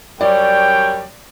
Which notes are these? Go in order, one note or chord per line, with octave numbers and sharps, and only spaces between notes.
F#2 G3 C#5 D5 G5